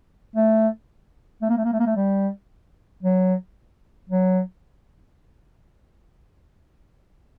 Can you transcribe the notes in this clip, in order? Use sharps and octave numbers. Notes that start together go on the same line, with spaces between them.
A3
A3
A#3
A3
A#3
A3
A#3
A3
G3
F#3
F#3